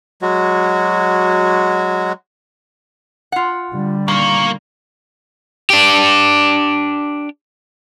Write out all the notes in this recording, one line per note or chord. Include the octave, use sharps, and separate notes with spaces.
F#3 G#3 F#4
F4 F#5
D3 G3
A#2 D#3 A#3 F5 C#6
D4 G4